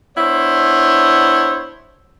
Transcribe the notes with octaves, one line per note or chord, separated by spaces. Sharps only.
B3 D4 E4 C5 C#5